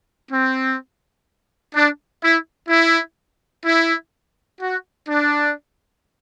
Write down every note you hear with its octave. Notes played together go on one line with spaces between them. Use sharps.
C4
D4
E4
E4
E4
F#4
D4